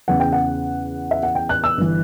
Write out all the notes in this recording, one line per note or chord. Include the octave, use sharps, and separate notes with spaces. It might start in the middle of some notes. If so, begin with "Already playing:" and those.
E2 C#3 E3 F#5
G5
F#5
E5
F#5
G5
F#6
E6
G1 E3